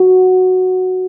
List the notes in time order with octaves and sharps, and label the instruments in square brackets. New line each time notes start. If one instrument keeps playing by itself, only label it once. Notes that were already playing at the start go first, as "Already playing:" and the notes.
Already playing: [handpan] F#4